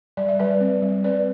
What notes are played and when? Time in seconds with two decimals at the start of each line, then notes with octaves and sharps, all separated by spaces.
0.17 G3 D5
0.28 E5
0.39 G3 B4 D5
0.60 C4
0.82 G3
1.04 C4 B4 D5